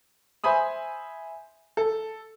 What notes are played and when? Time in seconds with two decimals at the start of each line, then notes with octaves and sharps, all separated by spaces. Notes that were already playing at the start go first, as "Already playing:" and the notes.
0.44 C5 E5 G#5 B5 D#6
1.77 A4